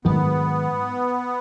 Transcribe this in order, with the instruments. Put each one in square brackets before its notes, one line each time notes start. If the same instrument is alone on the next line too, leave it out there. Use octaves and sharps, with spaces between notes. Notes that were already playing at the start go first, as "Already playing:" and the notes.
[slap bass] G#2 D#3 F#3 [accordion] B3